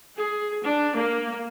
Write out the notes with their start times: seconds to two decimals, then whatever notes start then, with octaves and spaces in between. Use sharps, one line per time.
0.19 G#4
0.64 D4
0.96 A#3